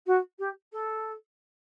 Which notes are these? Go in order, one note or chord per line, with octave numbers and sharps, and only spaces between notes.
F#4
G4
A4